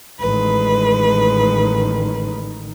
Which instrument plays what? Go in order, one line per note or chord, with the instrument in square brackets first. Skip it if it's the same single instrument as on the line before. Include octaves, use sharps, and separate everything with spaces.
[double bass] A1 D#3 [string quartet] G#3 B4